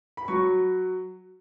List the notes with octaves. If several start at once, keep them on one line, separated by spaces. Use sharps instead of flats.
B5
F#3 C#6